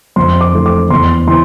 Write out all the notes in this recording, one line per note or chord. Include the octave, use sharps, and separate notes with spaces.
F2 C6
D6
E3 A3
D6
E2 C6
E3 C6